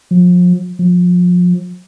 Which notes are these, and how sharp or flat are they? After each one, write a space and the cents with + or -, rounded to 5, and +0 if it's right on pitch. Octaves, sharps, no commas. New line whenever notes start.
F3 +35
F3 +30